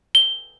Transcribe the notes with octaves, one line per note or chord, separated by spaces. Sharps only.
G7